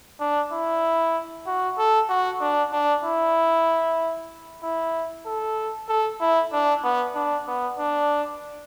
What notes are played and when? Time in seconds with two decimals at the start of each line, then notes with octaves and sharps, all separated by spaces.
0.20 D4
0.52 E4
1.47 F#4
1.78 A4
2.09 F#4
2.41 D4
2.72 D4
3.04 E4
4.63 E4
5.26 A4
5.89 A4
6.21 E4
6.52 D4
6.84 B3
7.15 D4
7.47 B3
7.79 D4